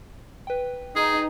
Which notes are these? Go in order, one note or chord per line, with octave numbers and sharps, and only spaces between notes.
B4 G5
D#4 G#4